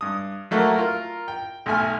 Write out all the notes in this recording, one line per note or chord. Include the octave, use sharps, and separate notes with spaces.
G2 D#6
F#3 A3 A#3 F#4
F4 A#4
G5
B1 A3 E5 G#5 F6